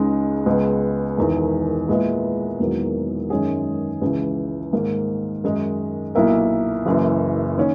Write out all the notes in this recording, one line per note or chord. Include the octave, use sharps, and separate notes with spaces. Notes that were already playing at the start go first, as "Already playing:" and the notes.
Already playing: C#2 C#3 G#3 D#4
C#2 C#3 G#3 B3
E1 E2 D#3
A#2 G#3 B3 E4
E1 E2 D#3 F#3 A#3
F#2 D#3 G#3 C#4 G#4
C#2 C#3 E3
G#2 D#3 A#3
F#2 D#3 G#3 D#4
B1 A#2 A#3 E4 A#4
F#1 F#2 E3
D#3 A#3 C#4